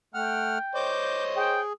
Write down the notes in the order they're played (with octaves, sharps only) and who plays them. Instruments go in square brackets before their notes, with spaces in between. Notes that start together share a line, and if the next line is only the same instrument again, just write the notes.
[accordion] A3 F#5 F6 [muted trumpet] G5
[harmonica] C5 C#5 D#5 [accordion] D6 G6
[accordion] G#4 [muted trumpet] G5